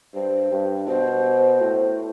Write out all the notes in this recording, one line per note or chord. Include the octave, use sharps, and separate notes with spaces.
G2 C5
G2
B2 C5
A2